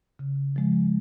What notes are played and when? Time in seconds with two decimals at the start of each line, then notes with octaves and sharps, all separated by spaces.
0.19 C#3
0.56 F3 G#3